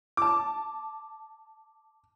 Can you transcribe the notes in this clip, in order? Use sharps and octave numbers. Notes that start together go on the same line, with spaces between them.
A5 D6